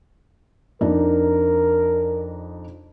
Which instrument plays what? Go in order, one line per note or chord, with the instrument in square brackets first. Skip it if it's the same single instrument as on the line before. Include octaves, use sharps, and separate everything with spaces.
[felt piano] F2 D4 D#4 [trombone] A#4